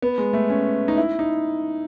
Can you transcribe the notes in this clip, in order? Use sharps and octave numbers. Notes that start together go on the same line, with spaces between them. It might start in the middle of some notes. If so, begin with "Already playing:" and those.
B3
G#3
A3
C#4
D#4
E4
D#4